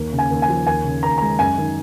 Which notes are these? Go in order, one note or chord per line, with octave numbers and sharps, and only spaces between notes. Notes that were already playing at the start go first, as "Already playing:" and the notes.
Already playing: D#2 A#3
C#3
G#5
D#2
G#5
F3
D#2 G#5
C#3
D#2 A#5
G#3 A#5
F#2 G#5
D#3